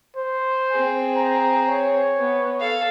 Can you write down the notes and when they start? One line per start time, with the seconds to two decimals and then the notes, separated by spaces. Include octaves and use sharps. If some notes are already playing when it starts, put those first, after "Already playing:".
0.16 C5
0.71 C4 G#4
1.16 A#5
1.68 C#5
2.19 B3
2.60 A4 F5